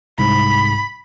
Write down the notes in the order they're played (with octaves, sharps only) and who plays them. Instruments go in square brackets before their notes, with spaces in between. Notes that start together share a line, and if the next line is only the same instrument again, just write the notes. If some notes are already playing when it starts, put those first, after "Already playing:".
[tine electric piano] C2 G#2 [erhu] B5